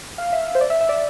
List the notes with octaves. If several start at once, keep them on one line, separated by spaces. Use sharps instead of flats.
F5
E5
C5
D5
E5
E5
D5